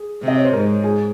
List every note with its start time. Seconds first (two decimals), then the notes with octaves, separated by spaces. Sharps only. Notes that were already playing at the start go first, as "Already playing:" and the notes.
Already playing: G#4
0.22 C3
0.28 D#5
0.36 C#5
0.44 C5
0.53 G#2 A#4
0.84 G#4